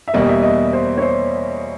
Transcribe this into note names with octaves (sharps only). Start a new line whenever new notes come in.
E5
E2 B2 G3 A#3 D#5
E5
D#5
C5
C#5
C5